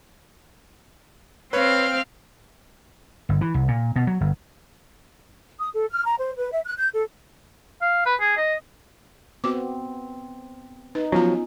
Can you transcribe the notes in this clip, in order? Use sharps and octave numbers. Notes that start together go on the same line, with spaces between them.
C4 B4 C#5 F5
G1
E3
C2
A#2
B2
F#3
G1
D#6
A4
F6
A#5
C5
B4
E5
F#6
G6
A4
F5
B4
G#4
D#5
B3 C4 F#4 D6
D#4 B4
F3 F#3 B3 C#4 F4 A#5